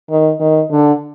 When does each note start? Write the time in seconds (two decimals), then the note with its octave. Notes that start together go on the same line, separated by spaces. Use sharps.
0.10 D#3
0.40 D#3
0.71 D3